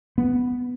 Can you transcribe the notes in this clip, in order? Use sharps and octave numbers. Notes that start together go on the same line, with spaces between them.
B3